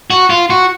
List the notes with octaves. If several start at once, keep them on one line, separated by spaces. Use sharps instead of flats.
F#4
F4
F#4